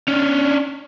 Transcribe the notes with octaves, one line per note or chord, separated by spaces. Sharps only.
C#4 D4